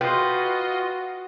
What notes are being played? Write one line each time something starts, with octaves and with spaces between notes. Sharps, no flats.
F4 F#4 B4 D#5 G5 C6